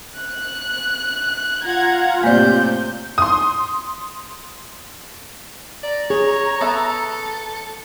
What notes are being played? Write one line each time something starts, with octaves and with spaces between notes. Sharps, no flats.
F#6
F4 F#5 A#5 G#6
A2 C3 A#3 C4 D5 G6
C6 D#6
D5 A#5
G#4 C#5
B3 A4 C#5 E5